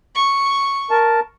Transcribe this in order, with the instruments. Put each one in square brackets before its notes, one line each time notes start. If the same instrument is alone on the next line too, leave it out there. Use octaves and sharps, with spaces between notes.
[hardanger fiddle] C#6
[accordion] A#4 A5